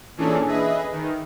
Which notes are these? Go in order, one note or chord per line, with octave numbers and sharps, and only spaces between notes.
A#2 E3 C#4 D4 G#4 A4
G#4 B4 D#5 E5
D#3